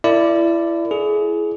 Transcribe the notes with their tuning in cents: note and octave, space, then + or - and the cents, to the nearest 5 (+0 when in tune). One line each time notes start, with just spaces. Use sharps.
E4 +25 A#4 -45 D5 +0
E4 +25 G#4 +25